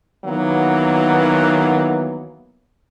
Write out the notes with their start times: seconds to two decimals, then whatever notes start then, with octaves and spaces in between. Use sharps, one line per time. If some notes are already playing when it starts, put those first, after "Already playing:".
0.25 D#3 E3 F#3 A#3 B3